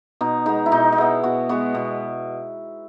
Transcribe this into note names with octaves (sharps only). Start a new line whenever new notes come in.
B2 D#4
G#3 B3 D#4
E4
B2 D#4
D#4
G#3 B3 E4
B2 F#4
G#3 B3 F#4
B2